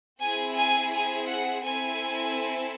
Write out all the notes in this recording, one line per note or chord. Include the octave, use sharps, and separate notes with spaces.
C4 E4 G#4 G#5
G#5
G#5
F#5
C4 E4 A4 G#5